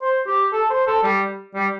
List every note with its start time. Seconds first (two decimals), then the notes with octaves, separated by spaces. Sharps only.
0.02 C5
0.27 G4
0.52 A4
0.70 C5
0.87 A4
1.03 G3
1.55 G3